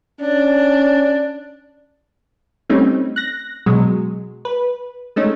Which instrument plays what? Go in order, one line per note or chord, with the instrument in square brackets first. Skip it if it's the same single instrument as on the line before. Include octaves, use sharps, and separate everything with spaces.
[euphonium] C#4 [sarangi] D4
[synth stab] G3 A3 C4 C#4 D#4
F#6 A#6
B2 F#3 G#3
B4
G#3 A3 C#4 D#4